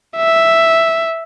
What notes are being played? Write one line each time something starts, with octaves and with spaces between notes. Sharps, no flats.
E5